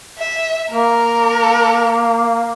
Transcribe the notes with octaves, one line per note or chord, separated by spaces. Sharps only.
E5
A#3 A#4